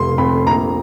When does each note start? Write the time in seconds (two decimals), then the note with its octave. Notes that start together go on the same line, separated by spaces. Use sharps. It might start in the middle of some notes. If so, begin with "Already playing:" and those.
Already playing: F1 F3 C6
0.18 F2 B5
0.47 A#1 A#5